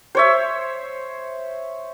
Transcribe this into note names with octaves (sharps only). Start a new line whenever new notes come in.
C5 C#5 E5